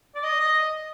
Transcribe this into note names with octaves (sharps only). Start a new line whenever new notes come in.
D5
D#5
D#5